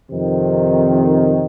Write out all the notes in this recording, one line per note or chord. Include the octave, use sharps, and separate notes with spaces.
F2 C3 D#3